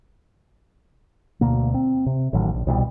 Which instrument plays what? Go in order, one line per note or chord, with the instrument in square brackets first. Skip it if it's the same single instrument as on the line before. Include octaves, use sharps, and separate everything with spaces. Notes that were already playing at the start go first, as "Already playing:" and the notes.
[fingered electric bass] D2 B2 A#3
C4
C3
A1 A2 D#3 F#3
A#1
C2 B2 F3 G3